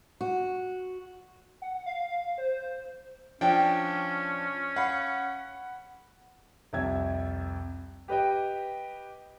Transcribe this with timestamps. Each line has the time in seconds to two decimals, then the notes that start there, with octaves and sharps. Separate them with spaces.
0.21 F#4
1.62 F#5
1.86 F5
2.38 C5
3.41 F3 C#4 D4 G5
4.76 F5 F#5 B5
6.73 C2 F2 E5 G#6
8.08 G4 B4 D#5 G5